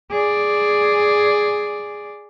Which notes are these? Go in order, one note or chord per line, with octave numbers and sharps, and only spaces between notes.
G#4 D5